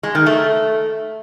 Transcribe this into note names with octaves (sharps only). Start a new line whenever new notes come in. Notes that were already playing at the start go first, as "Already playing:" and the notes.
G#3
D#3
A3